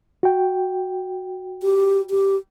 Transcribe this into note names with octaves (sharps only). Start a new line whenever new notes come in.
F#4 G5
G4
G4